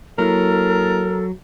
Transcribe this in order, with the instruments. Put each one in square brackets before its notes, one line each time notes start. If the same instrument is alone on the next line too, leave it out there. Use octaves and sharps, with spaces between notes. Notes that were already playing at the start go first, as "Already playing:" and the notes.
[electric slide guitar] F#3 [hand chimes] A#3 E4 F6 [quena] A4 [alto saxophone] A#4